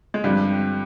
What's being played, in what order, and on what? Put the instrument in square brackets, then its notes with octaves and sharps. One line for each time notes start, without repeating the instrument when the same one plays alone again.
[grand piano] G#3
[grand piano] G2 G3 [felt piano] D3 F3 C4